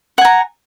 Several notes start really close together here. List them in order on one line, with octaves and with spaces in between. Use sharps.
F#5 G#5 A#5